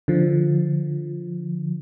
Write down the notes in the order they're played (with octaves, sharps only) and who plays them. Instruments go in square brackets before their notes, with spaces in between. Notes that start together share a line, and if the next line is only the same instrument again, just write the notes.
[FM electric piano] D3 F3